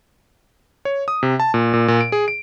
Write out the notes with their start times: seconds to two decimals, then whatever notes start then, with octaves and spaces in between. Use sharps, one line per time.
0.85 C#5
1.08 D#6
1.23 C3
1.40 A5
1.54 A#2
1.74 A#2
1.88 A#2
2.01 D7
2.12 G#4
2.28 D7